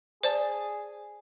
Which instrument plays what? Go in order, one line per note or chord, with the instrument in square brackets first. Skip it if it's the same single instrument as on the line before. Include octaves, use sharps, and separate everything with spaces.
[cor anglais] G#4 [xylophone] C5 D5 A5